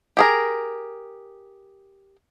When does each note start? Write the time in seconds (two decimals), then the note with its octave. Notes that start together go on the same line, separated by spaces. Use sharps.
0.17 G4 G#4 A#4